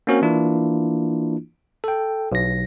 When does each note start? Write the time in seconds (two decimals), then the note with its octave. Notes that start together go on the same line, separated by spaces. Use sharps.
0.07 A#3 C4 C#4 F#4 A#4
0.22 E3 A#3 D4 E4 F4
1.84 A4 G5
2.32 B1 A#6